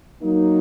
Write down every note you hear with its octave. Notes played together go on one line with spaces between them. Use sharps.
F#3 A#3 D#4